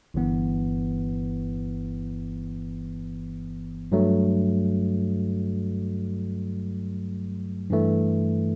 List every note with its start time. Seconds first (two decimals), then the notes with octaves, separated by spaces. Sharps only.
0.14 G1 G2 E3 B3
3.92 G2 F#3 A3
7.70 G2 E3 A3